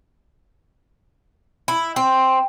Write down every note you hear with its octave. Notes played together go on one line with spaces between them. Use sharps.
E4
C4